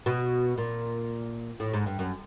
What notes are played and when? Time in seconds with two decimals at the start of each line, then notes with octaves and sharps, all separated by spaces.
0.06 B2
0.58 A#2
1.60 A2
1.74 G#2
1.86 G2
1.99 F#2